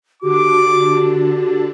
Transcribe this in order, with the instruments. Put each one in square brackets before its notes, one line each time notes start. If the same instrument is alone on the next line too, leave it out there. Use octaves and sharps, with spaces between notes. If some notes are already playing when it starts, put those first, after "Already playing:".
[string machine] D3 D4 [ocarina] F#4 [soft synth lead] G4 [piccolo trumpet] D6